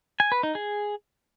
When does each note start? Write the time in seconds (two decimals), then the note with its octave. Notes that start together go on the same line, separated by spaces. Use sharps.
0.20 G#5
0.32 B4
0.43 D#4
0.55 G#4